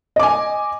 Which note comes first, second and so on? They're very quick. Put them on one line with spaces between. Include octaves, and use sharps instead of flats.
D#5 D6 G#5